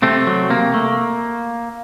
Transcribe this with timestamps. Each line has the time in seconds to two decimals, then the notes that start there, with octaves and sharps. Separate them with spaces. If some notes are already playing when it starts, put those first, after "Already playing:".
0.02 C3 A3 C4
0.27 F#3
0.50 C3 A#3
0.74 A3